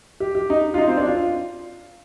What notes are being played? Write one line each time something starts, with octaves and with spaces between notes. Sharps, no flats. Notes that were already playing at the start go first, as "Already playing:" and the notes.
G4
G4
D#4
F4
D#4
C4
D4
F4